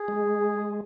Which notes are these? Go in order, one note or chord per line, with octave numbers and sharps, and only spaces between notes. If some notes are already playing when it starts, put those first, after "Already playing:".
Already playing: G#4
G#3